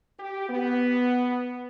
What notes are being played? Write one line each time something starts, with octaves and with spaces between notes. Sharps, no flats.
G4
B3